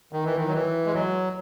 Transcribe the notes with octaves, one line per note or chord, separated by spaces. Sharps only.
D#3
E3
D#3
F#3
E3
G#3
F#3